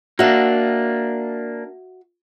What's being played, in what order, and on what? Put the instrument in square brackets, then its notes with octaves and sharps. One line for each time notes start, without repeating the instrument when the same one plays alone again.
[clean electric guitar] A#3 D4 [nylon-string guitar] F#4 E5